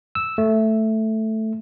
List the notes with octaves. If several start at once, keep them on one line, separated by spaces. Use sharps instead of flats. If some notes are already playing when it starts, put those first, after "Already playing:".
E6
A3